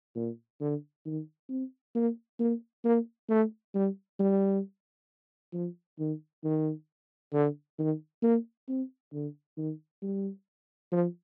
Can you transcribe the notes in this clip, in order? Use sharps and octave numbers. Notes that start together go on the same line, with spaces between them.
A#2
D3
D#3
C4
A#3
A#3
A#3
A3
G3
G3
F3
D#3
D#3
D3
D#3
A#3
C4
D3
D#3
G3
F3